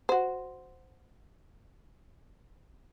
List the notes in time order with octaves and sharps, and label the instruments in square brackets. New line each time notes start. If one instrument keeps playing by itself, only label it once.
[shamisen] F#4 C5